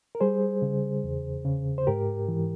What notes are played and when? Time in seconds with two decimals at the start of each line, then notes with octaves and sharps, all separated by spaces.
0.15 A#4
0.20 G3 G#4 C5
0.62 C#3
1.04 E2
1.45 C#3
1.78 C5
1.87 G#2 G4 A#4
2.28 E3